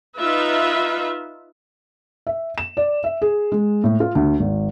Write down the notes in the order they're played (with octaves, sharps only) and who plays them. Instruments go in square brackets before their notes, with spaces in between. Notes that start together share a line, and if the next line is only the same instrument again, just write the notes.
[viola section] D#4 F4 B4 E5
[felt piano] E5
E7
D5
E5
G#4
G#3
A2
F4
D2
G#1